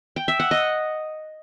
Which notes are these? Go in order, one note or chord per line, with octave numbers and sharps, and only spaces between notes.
G5
E5
F#5
D#5